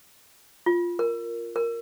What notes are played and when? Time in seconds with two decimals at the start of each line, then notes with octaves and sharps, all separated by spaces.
0.66 F4
0.99 A#4
1.56 A#4